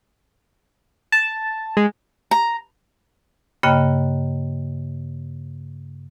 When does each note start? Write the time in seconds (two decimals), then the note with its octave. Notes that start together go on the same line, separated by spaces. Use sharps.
1.12 A5
1.77 G#3
2.31 A#5
3.63 G2 C#3 A#3 D#5 G5 F#6